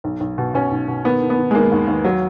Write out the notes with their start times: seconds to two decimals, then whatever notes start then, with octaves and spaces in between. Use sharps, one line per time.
0.04 B1
0.20 B1
0.38 B2
0.54 B2 C#4
0.71 B1
0.88 B2
1.04 D#3 B3
1.22 D#3
1.30 B3
1.37 D#3
1.51 G#3
1.55 D#3 A#3
1.72 D#2
1.87 D#2
2.05 F#3